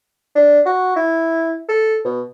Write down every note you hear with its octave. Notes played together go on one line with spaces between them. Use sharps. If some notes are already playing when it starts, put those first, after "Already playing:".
D4
F#4
E4
A4
B2